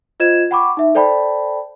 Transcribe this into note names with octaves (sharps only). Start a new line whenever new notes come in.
F4 C5 D#5 G#6 E7
F#5 G5 B5 C#6 D6
D#4 E5
A4 C5 D5 G5 A5 B5